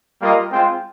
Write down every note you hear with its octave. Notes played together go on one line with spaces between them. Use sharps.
G3 A#3 F4 A#4 D#5
G#3 C4 F4 C5 G5